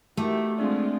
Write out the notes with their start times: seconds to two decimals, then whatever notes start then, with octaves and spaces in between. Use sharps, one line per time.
0.17 D#3 A3 E4 F#4 G4 A5 D6
0.58 F3 G#3 C4 D4 F4 D5